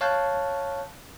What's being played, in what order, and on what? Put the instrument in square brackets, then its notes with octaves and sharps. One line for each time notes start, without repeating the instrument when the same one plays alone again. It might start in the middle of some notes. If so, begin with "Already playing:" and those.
[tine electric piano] C#5 F5 A5 F#6 G6